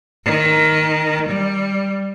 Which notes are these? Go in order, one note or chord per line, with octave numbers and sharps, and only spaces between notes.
D#3
G3